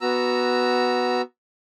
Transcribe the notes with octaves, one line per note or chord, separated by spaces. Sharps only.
B3 F#4 A#5 E6